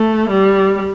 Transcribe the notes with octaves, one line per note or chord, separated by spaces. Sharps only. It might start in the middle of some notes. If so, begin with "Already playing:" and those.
Already playing: A3
G3